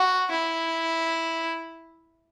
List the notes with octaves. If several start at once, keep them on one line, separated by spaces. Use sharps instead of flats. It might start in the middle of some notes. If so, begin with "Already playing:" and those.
Already playing: F#4
E4